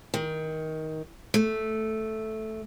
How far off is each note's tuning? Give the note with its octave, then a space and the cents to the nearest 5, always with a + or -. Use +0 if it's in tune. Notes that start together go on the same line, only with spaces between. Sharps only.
D#3 +15
A3 -5